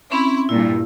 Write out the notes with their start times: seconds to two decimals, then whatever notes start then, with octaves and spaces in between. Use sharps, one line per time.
0.12 C4 C#4 E4 C6
0.49 G2 A#2 E4